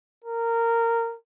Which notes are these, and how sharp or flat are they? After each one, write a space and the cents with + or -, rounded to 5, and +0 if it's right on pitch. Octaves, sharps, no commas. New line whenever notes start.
A#4 -15